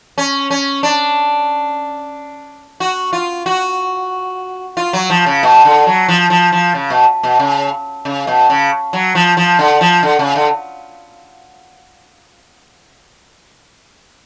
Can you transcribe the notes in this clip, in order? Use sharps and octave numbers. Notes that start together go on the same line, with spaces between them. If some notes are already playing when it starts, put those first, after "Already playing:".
C#4
C#4
D4
F#4
F4
F#4
F4
F#3
F3
C#3
B2
D3
F#3
F3
F3
F3
C#3
B2
B2
C#3
C#3
B2
C#3
F#3
F3
F3
D3
F3
D3
C#3
D3